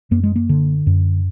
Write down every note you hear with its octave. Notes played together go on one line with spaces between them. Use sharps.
F#2 A#3
G#3
A#3
D3
F#2